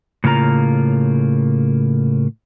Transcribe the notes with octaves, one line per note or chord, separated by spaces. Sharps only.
A2 C#3 A#3 F4 A#5